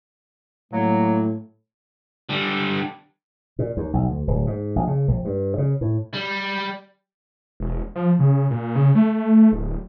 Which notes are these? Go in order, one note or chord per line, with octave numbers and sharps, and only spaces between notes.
A2 F#3 A#3
D3 G3
A#2
D#2
B1
D2
D1
G#2
A#1
C#3
A#1
G2
C#3
A2
G3
E1
F3
C#3
A#2
C#3
A3
A3
D1